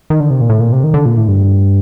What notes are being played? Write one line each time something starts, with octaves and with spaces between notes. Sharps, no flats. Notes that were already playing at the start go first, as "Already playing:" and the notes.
D#3
D3
C3
A#2
A2
A#2
C3
D#3
D3
A#2
A2
G2